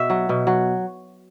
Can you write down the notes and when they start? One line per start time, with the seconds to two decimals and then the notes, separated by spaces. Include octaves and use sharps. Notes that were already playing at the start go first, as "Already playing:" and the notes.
Already playing: B2 E5
0.10 F#3
0.29 B2
0.47 F#3